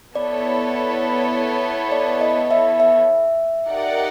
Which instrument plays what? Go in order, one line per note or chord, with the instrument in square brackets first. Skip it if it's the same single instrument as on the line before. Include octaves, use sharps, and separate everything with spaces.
[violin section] B3 E4 A4 C#5 [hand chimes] D5
[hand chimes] D5
D#5
E5
E5
[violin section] D#4 G4 A#4 D5 F#5